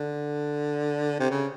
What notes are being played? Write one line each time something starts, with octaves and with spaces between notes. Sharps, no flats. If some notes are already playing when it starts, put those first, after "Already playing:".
Already playing: D3
C3
C#3